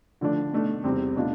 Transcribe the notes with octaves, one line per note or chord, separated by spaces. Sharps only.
D3 F3 A3 D4
B2 A3 D4
E2 C3 G3 C4
B2 A3 D4 F4